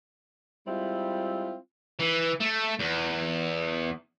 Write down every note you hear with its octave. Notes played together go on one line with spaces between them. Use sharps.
G3 G#3 C4 E4 F4
E3
A3
E2